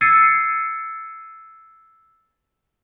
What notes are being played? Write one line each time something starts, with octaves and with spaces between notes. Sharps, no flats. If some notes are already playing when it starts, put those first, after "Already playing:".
E6 G#6 A6 C7 C#7 D#7